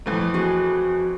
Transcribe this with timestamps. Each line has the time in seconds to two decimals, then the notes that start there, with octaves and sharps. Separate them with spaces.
0.06 F2 E3 A3
0.34 F#4 G#4 G#5